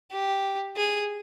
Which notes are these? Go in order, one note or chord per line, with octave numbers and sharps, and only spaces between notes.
G4
G#4